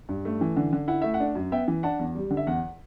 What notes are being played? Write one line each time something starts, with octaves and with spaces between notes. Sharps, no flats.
G2
A3
E3
D3
D3
E4 F#5
A3 E5
F#5
D4
F#2
B3 E5 G5
E3
D4 F#5 A5
E2
G3
D3
E5
E2 F#5